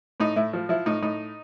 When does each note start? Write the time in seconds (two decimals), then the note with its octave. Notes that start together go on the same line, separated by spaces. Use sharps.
0.20 A2 D#4
0.36 A2 E4
0.53 F3
0.69 F3 E4
0.86 A2 D#4
1.02 A2 D#4